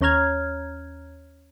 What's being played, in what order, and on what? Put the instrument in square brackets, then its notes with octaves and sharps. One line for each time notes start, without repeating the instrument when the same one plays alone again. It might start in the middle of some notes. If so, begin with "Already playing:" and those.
[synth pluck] D#2 C#4 C#5 A#5 F6 G#6